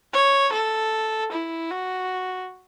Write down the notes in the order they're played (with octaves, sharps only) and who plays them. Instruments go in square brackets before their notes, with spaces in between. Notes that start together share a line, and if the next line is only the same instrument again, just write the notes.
[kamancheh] C#5
A4
E4
F#4